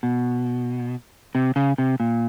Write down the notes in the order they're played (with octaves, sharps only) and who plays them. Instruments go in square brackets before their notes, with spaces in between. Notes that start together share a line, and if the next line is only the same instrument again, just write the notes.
[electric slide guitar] B2
C3
C#3
C3
A#2